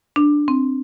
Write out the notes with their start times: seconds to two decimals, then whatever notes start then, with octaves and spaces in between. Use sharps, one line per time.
0.16 D4
0.48 C4